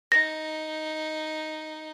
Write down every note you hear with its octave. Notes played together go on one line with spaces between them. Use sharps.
D#4 A#6